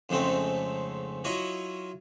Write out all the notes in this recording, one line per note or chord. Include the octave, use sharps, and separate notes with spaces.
F2 G#2 C#3 G#3 A3 C4
F#3 E4 F4 C#5 D#5